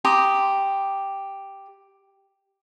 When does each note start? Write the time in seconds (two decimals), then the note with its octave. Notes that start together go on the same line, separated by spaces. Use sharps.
0.05 G4 A#5 C6 D#6